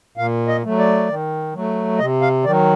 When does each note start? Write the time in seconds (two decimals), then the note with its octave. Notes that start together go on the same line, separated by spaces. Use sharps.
0.17 A#2 F5
0.48 D#5
0.64 F#3 A3
0.79 D5
1.08 D#3
1.54 F#3 A3
1.99 C3 D#5
2.22 F5
2.44 D#3 D5
2.48 F#3